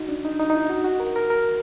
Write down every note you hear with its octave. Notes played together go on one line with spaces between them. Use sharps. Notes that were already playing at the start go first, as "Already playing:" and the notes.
Already playing: D#4 F#4
D4
D#4
D#4
D#4
E4
F#4
F#4
A#4
A#4
A#4